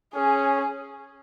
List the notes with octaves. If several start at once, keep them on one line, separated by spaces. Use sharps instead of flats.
C#4 G#4